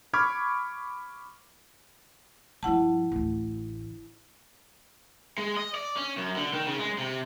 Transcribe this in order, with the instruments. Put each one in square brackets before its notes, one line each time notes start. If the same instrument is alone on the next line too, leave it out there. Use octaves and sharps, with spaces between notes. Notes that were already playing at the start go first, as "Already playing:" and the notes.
[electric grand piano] B5 C#6 D6 F6 G#6
[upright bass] G2 F3 [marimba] E4 F#5 A5
[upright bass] A1 D2
[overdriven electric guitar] G#3
D#5
D5
C#4
F#2
D3
D#3
C#3
G#3
C3